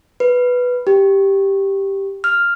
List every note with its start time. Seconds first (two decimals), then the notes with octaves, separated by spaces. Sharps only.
0.20 B4
0.87 G4
2.24 F6